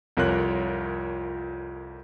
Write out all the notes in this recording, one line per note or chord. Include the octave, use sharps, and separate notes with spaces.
C2 F2 F4 A#4 C#5 F#6